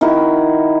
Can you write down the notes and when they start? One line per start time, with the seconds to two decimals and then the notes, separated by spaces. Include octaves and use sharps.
0.01 D#3 E4 F#4 A#4